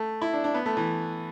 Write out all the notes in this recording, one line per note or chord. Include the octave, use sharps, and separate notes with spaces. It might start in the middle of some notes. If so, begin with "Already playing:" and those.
Already playing: A3
E4
D4
D4
B3
A3
E3